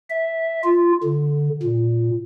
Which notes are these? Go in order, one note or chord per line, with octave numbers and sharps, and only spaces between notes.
E5
F4
D3
A#2